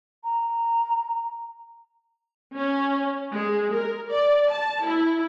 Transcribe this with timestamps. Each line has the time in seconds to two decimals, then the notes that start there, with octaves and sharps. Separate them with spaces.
0.24 A#5
2.55 C#4
3.32 G#3
3.73 A#4
4.08 D5
4.50 A5
4.84 E4